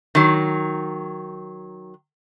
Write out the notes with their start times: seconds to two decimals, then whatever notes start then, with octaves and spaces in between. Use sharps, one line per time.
0.15 D#3 F#3